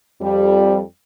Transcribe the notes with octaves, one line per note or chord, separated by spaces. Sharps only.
F2 G3